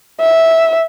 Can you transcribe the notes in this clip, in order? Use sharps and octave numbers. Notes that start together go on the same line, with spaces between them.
E5